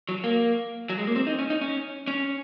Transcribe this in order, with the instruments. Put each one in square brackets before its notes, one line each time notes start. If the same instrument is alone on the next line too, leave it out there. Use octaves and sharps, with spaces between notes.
[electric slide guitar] F#3
A#3
F#3
G#3
A#3
C4
D#4
C#4
D#4
C#4
C#4